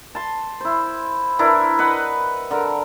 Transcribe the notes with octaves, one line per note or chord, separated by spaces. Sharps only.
A5 C6
E4 C5
E3 D4 E4 A#4
B4 D#5 F#5
D3 A#4